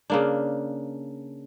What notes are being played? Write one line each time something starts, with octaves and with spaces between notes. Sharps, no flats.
C#3 A#3 D4